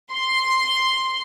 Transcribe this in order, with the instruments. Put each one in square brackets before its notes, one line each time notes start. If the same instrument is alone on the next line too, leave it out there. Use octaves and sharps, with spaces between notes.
[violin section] C6